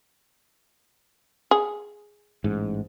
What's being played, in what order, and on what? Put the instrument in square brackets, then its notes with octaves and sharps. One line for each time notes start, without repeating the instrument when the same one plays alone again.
[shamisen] G#4
[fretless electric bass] A1 G#2